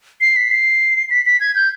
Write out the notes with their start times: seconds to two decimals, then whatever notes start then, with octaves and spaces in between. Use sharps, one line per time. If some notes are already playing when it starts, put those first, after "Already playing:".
0.21 C7
0.36 B6
0.51 C7
1.10 B6
1.26 B6
1.40 G#6
1.55 G6